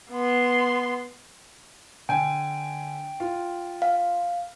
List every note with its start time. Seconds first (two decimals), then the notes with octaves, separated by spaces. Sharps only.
0.12 B3 C6
2.09 D3 G5 G#5
3.20 F4
3.82 F5